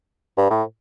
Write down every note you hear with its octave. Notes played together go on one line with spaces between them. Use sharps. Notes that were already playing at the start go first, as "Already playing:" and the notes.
G2
A2